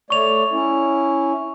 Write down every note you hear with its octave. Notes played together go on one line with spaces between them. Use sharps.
A3 C#5 D5 C#6 F7
C#4 E4